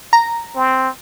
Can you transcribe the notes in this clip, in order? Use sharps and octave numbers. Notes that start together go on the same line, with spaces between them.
A#5
C4